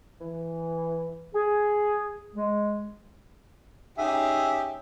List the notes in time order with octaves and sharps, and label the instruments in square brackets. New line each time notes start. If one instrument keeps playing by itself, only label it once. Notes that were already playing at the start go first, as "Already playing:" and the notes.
[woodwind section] E3
G#4
G#3
[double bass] C#4 D#4 [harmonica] G4 G#4 [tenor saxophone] E5